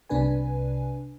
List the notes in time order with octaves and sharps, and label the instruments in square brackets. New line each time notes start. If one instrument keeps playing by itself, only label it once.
[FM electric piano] C2 C3 D4 B4 G#5